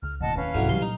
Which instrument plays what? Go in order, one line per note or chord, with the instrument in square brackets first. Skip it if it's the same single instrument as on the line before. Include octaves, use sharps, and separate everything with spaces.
[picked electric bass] C#2 [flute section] F6
[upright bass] E1 [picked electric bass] D#2 A2 [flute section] D#5 F#5 A5
[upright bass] D3 [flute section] C#4 B4 F5
[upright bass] C2 G#2 [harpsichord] F2 E3 F#3
[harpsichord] C2 C6 [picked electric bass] A2 E3 G3 [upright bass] F#3
[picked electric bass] A#2 [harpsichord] D#4